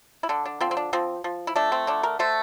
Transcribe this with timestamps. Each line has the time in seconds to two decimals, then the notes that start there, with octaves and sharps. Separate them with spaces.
0.23 E4
0.29 D3 D4
0.46 D4
0.61 F3 C4
0.71 C4
0.77 D4
0.93 F3 C4
1.24 F3
1.47 E4
1.56 A3 D4
1.72 C4
1.87 D3 D4
2.03 A#4
2.19 A3 C5